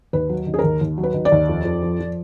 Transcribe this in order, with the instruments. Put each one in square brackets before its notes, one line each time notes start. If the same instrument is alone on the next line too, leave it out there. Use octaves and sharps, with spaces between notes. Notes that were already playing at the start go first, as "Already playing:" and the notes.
[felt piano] D#2 B4
F#3
D#3
G#4
A#4
D#2
D#2
F#3
B4
D#3
D5
D#2
F2
F2
F3
F3